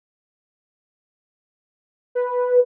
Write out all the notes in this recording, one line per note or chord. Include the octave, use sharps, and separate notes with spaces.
B4